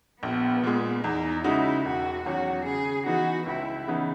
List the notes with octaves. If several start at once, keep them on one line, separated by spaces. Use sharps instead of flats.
A#1 B3
A#2 G#3
E2 D#4
C#3 G#3 D#4 E4 F#4
E1 F#4
E2 D#3 F#3 C#4 F#4
C#3 G#4
E3 B3 D#4 F#4
C#2 E4
C#3 E3 B3 D#4